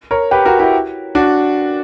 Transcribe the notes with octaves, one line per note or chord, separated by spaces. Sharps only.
A#4 C#5
G4 B4
F#4 A#4
E4 G4
D4 F#4